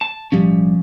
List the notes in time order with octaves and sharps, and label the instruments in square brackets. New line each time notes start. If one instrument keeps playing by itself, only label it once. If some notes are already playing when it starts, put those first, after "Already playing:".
[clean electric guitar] A5
[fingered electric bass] B1 A2 G3 [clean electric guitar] F3 C#4